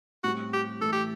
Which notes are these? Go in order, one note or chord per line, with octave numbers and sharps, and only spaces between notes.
A2 G3 C4 F#4
G4
A2 E3 A3 A4
G4